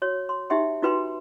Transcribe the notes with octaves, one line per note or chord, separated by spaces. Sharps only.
F#4 C#5
C6
D#4 G4 E5 G5 C6
D#4 F4 F#4 B4 G5 C6